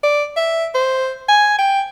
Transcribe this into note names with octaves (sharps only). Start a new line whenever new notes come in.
D5
E5
C5
G#5
G5